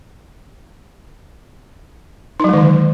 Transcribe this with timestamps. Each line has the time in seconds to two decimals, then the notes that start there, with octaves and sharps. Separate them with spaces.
2.40 D#4
2.44 F#3
2.49 G#3
2.53 D#3
2.58 D3